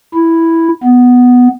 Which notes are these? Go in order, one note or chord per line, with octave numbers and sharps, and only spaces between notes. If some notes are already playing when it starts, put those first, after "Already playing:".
E4
B3